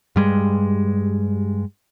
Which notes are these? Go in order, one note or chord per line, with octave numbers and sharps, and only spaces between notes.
G2 G3 G#3